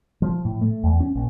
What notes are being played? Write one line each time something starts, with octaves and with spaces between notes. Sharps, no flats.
F3
A2
A3
E2
C#4
A#1